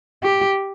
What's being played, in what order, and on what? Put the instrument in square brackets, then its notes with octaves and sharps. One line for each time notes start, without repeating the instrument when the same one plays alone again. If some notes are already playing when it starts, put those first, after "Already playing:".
[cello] G4